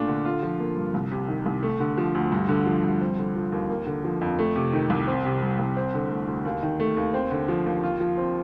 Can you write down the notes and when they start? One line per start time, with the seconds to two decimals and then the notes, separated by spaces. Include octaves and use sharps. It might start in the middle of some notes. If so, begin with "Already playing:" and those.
Already playing: A#2 A3 D4 F4
0.08 D3
0.25 F4
0.42 F3
0.60 A#3
0.76 G2
0.94 C2
1.11 C3
1.28 D#3
1.46 C2
1.63 A3
1.80 D3
1.97 F3
2.15 D2
2.32 G2
2.48 D3
2.66 F3
2.84 G2
3.01 C4
3.18 D3
3.36 F3
3.52 D#2
3.70 A#3
3.86 D3
4.04 F3
4.21 F2
4.39 A3
4.56 C3
4.73 D#3
4.90 C2
5.07 C4
5.25 C3
5.42 G3
5.59 C2
5.77 C4
5.94 D3
6.11 A3
6.28 D2
6.45 D#2
6.63 D#3
6.80 A3
6.97 D#2
7.14 C4
7.31 D3
7.48 F3
7.66 D#2
7.83 F4
8.00 F3
8.17 C4